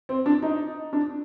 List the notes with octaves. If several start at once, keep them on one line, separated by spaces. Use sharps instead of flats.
C4
D4
D#4
D4